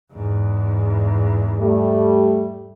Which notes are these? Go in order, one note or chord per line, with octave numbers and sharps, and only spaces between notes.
E2 G#2
G3 A3